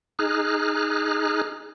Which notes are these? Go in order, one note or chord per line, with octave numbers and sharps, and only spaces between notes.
D#4 G#4 F6 F#6